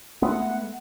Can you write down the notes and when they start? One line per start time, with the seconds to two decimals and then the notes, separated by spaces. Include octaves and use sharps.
0.22 G#3 A3 B3 F#5